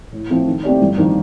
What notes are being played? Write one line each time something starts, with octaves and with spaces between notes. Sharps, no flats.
A2
F3 A3 C4
D#3
A3 C4 G4 D5
G1
F2 D#3 A#3 D4